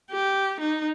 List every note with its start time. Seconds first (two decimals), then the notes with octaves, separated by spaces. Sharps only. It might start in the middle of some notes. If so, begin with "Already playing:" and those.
0.11 G4
0.60 D#4